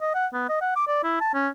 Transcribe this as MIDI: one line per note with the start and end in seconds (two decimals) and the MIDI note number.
0.01 0.11 75
0.14 0.27 78
0.33 0.49 59
0.49 0.58 75
0.61 0.72 78
0.76 0.86 86
0.87 1.02 74
1.04 1.17 64
1.21 1.30 81
1.33 1.49 61